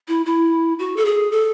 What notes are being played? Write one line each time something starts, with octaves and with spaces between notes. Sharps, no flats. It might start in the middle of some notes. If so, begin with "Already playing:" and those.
E4
E4
F#4
A4
G#4
A4